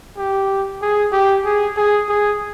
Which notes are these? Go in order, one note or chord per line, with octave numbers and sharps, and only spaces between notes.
G4
G#4
G4
G#4
G#4
G#4